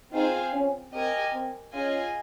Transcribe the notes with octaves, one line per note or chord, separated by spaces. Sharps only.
C4 D#4 F4 G#4 C5 F5
C#4
C4 G4 A#4 D#5 G#5
C4
C#4 F4 G#4 D#5 G#5